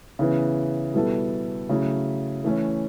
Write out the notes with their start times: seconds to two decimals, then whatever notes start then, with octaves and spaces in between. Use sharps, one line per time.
0.19 C#3 E3 B3
0.94 B2 G3 B3 E4 A4
1.69 C#3 F#3 A3 E4
2.44 E3 A3 C#4